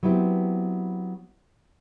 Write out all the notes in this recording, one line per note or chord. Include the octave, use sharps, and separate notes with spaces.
F#3 B3 C4 E4 G4